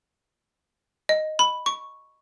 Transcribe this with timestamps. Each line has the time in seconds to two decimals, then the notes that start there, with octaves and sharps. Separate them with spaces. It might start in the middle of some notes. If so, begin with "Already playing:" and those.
1.09 D#5
1.39 B5
1.66 C#6